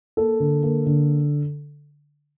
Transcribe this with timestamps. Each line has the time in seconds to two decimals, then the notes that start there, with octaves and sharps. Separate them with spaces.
0.17 A#3 A4
0.40 D3
0.63 A#3
0.86 D3